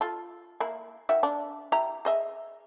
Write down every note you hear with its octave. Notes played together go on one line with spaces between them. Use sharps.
F4 A4
A#3 E4
D#3 F#4 E5
D4
E4 G4 A#5
G#4 D#5 E5